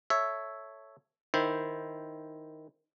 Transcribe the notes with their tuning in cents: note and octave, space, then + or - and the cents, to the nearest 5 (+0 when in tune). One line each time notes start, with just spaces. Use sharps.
A4 +0 C#5 +0 E5 +0
D#3 +0 E4 -5 C5 +0